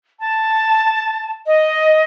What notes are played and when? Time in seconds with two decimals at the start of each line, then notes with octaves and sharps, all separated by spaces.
0.21 A5
1.46 D#5